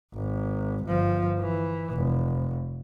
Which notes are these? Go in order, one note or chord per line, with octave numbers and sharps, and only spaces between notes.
G#1
G1 F3
E3
F1